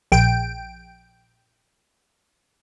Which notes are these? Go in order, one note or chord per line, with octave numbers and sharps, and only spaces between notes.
A#1 G5 D7